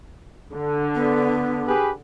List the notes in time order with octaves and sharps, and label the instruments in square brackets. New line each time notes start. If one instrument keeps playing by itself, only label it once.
[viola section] D3
[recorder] B3
[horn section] G4 G#4 B4